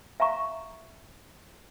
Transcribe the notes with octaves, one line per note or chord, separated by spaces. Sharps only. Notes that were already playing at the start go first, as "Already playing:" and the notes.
E5 F5 A#5 C#6